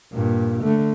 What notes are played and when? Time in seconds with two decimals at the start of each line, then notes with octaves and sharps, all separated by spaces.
0.14 G2 A#2
0.64 D3 A3